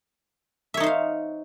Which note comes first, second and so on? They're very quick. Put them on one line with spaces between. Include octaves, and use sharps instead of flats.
E5 C#5 D#4 C5 F5